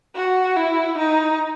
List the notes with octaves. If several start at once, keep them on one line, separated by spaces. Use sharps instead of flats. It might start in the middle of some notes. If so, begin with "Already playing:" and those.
F#4
E4
D#4